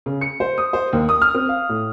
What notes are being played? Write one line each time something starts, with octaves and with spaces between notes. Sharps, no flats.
C#3
C#7
C5
D#6
C5
D#2
D#6
F6
C4
F5
A2